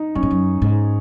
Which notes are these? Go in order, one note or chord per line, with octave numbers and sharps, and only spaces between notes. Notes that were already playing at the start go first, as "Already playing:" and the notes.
Already playing: D#4
F#2 C#4
G#2
F#2
G#2